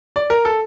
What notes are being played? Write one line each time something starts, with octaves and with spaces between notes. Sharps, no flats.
D5
A#4
A4